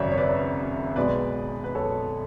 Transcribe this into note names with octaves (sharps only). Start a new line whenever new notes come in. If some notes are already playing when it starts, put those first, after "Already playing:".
Already playing: G#1 F#2 C#3 F#3 C#5 D5 E5
C#5
B4 D5
B1 B2 G#3 B4 D5
B4
A4 C#5